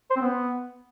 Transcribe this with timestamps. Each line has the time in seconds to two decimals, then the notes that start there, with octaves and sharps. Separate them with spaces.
0.10 C5
0.16 C4
0.21 B3